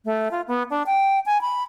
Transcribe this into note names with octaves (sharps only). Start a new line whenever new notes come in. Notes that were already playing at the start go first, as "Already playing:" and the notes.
A3
F4
B3
D4
G5
G#5
B5